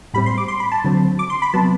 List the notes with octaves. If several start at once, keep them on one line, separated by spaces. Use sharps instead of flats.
A2 G3 C4 B5
C6
D6
C6
B5
A5
D3 F#3 C4
D6
C6
B5
C3 F#3 B3 A5